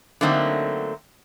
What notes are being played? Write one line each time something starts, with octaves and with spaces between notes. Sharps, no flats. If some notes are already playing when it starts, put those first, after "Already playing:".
D3 F#3 A3 A#3 C4 D#4